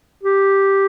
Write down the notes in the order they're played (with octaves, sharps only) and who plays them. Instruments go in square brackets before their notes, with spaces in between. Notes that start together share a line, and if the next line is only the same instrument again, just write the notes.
[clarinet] G4